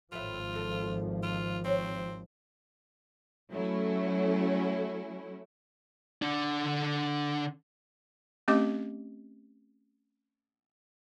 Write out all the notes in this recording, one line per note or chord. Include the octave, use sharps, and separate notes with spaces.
G#1 A2 F3 F4 B4 E5
F#3 A4
F4
C4 C#5
F#3 A3 C#4 E4
D3 D4
A3 C4 C#4 G4 D#5 D6